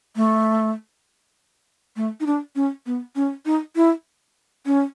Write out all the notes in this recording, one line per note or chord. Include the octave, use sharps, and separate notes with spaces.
A3
A3
D#4
D4
C#4
B3
C#4
D#4
E4
C#4